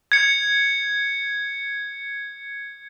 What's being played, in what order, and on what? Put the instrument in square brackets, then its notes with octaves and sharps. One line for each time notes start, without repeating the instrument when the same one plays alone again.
[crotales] G#6 C#7